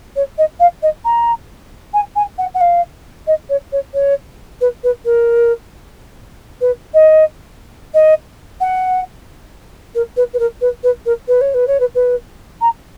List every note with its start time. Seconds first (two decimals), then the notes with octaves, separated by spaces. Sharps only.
0.16 C#5
0.38 D#5
0.60 F5
0.83 D#5
1.05 A#5
1.94 G#5
2.16 G#5
2.38 F#5
2.54 F#5
2.61 F5
3.27 D#5
3.49 C#5
3.72 C#5
3.94 C#5
4.61 B4
4.84 B4
5.05 A#4
6.61 B4
6.94 D#5
7.94 D#5
8.61 F#5
9.95 A#4
10.17 B4
10.33 B4
10.39 A#4
10.61 B4
10.83 B4
11.06 A#4
11.28 B4
11.41 C#5
11.54 B4
11.67 C#5
11.80 B4
11.95 B4
12.61 A#5